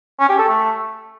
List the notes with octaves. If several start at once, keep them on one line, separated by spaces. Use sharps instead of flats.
C#4
G4
A4
A3